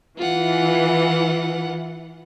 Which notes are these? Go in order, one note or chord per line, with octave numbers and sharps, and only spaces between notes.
E3 F4 F#5